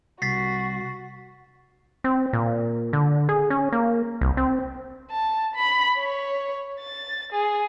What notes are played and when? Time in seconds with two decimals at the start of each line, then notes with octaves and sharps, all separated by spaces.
0.22 C2 F#4 A6 B6 C7
2.04 C4
2.33 A#2
2.93 D3
3.29 G#4
3.50 C#4
3.72 A#3
4.21 C2
4.37 C4
5.11 A5
5.56 B5
5.98 C#5
6.80 A6
7.33 G#4